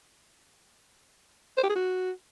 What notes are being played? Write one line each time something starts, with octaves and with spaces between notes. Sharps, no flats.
C5
G4
G#4
F#4